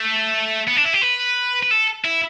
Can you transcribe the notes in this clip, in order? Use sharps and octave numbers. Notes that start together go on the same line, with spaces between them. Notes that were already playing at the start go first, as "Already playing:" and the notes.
Already playing: A3
B3
D4
E4
G4
B4
B4
A4
E4